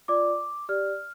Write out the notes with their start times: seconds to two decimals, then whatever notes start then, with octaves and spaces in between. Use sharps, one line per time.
0.08 F4 D5 D6
0.69 G4 D5 F6